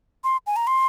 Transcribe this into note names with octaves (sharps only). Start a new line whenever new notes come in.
C6
G#5
A#5
C6